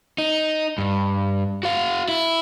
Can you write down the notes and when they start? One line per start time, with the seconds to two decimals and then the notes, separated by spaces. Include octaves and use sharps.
0.18 D#4
0.78 G2
1.63 F#4 F5
2.08 E4